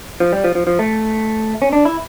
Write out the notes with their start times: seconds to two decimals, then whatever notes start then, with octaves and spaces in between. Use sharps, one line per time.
0.20 F3
0.33 G3
0.44 F3
0.55 F3
0.67 F3
0.79 A3
1.62 C#4
1.73 D4
1.85 E4